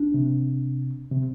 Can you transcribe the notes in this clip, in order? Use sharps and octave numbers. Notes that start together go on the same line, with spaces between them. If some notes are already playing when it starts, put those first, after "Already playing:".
Already playing: D4
C3
C3